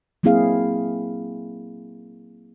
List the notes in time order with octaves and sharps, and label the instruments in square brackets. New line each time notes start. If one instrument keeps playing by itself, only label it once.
[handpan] F#3 A#3 C4 E4 G#4 F5